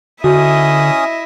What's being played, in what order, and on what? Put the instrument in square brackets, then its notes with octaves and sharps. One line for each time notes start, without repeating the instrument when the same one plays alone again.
[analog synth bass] D3 [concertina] C#4 D#6 [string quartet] E4 D#5 E5 [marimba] F#4